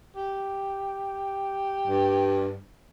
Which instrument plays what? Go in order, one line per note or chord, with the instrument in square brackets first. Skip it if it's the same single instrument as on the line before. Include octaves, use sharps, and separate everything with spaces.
[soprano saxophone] G4
[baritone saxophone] G2